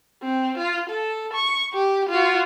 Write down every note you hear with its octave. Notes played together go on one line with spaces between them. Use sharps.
C4
F4
A4
C#6
G4
F4 F#4